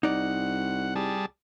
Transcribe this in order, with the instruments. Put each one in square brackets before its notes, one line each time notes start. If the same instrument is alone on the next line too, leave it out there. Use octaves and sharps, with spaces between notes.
[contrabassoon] C2 [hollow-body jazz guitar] D#4 D5 [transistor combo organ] F#5
[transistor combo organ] G3 G#4 A5